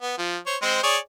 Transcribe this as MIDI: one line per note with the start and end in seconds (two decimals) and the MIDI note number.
0.02 0.17 59
0.18 0.37 53
0.46 0.56 72
0.46 0.56 73
0.62 0.79 56
0.62 0.79 60
0.62 0.79 72
0.83 0.97 68
0.83 0.97 73
0.83 0.97 74